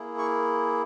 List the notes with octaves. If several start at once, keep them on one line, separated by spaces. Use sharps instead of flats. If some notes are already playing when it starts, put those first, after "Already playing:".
Already playing: A#3 E4 G#4
C#6